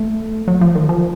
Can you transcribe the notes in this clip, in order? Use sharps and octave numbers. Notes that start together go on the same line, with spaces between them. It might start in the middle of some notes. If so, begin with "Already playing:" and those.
Already playing: A3
F#3
F3
D#3
F3